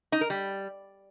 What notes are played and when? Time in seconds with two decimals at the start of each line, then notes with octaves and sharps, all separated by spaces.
0.12 D#4
0.21 A#4
0.30 G3